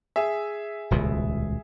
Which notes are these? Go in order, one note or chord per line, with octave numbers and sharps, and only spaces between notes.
G#4 E5
D#1 C#2 B2